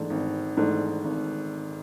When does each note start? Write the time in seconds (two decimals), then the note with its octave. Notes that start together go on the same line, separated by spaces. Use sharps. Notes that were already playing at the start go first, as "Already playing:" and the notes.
Already playing: G#1 G#2 E3 A3 D4
0.10 G#1
0.57 G#2 E3 A3 D4
1.04 G#1